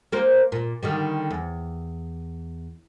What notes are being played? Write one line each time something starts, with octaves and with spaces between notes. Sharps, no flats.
A#3 A#4 C5
A#2
D3 D#3 G3
E2